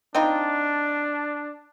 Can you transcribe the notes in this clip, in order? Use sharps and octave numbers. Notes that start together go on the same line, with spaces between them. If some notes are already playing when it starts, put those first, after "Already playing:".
C4 D4 D#4 F4